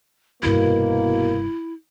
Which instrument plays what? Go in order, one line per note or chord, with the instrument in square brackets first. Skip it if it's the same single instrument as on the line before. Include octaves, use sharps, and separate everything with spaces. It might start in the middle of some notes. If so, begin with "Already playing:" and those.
[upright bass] F1 G2 [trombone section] B2 A#3 [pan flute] E4